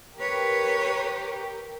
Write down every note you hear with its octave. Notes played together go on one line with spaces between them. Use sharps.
G4 A#4 B4 C#5